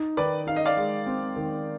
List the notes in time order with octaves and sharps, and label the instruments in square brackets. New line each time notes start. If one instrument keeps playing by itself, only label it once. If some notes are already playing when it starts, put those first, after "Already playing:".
Already playing: [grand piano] D#4
[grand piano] D#3 [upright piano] B4 D5
[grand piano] D#4 [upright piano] F5
[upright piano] D#5
D5 F5
[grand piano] G#3
C4
D#3